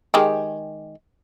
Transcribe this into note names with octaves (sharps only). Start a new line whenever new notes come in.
D#3 G#3 G4